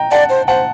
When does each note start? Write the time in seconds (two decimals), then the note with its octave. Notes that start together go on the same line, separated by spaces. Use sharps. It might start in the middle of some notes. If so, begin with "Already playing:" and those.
Already playing: D#5 G5 A#5
0.11 D5 F#5 A5
0.29 C5
0.48 C5 F#5 A5